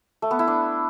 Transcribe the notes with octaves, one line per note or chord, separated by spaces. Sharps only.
A3
B3
E4
D4